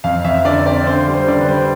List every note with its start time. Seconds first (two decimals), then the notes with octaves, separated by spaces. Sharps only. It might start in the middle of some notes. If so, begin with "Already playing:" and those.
0.04 F2 F5
0.25 F2 E5
0.45 D3 D5
0.65 C4 D5
0.86 D3 C5
1.07 G3
1.14 C5
1.27 D3 D5
1.41 B4
1.48 G3 C5